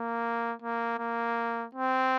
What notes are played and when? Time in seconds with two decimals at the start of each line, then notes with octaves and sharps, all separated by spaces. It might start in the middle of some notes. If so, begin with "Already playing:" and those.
Already playing: A#3
0.62 A#3
0.99 A#3
1.75 C4